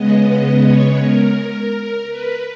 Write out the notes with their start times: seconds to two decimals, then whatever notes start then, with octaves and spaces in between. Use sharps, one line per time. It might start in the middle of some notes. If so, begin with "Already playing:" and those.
Already playing: C#3 G#3 B3 D#5
0.65 C#5
1.01 A#4
1.38 A#4
2.10 B4